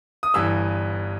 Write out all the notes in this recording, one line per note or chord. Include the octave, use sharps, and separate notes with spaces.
D#6
G1 G2 E3 E6